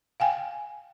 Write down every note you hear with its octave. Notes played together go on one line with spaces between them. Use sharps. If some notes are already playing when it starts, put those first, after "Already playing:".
F5 G5 G#5